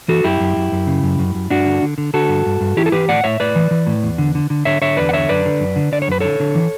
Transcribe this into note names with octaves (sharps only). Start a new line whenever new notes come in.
E3 F#4 A4
F#2 E4 G4
F#2
F#2
F#2
C#3
F#2
F#2
F#2
G2 D4 F#4
D3
D3
D3
D3 F#4 A4
G2
G2
G2
E3 E4 G4
A4
E3 G4 B4
A2 D5 F#5
A2 C#5 E5
A2 B4 D5
E3
E3
A2
E2
D3
D3
D3
D3 C#5 E5
D3 C#5 E5
E2 B4 D5
F#5
D3 C#5 E5
F#2 B4 D5
D3
F#2
D3
D3 D5
C#5
F#2 B4
D3 A4 C#5
D3
E3